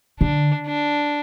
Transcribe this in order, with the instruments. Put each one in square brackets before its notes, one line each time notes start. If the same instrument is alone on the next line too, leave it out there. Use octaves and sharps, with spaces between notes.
[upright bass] D3 [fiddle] D4
[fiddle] D4